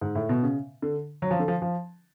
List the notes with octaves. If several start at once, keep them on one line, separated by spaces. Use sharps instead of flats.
G#2
A2
B2
C#3
D3
F#3
F3
D3
F3
F3